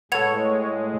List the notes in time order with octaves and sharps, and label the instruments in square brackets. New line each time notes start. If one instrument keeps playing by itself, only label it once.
[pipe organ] A2 G#3 [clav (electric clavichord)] A4 B4 [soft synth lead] C#5 [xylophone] F#5 G#6 F7